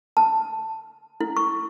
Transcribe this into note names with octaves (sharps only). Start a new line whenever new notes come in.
A5
E4
C#6